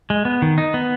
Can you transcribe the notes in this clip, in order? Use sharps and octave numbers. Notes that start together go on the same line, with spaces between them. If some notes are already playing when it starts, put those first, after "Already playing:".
G#3
B3
D#3
D#4
B3